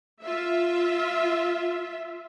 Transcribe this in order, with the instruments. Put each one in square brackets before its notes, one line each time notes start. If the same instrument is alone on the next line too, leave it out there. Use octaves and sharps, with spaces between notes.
[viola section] F4 E5